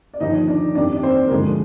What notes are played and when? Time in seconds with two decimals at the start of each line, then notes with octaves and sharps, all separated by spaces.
0.14 D5
0.20 D#2 D3 F3 D#4 D#5
0.48 D4 D5
0.75 F2 D#3 G3 D4 D5
0.97 D5
1.03 C4 C5
1.27 A#4
1.31 D2 D3 F3 G#3 G#4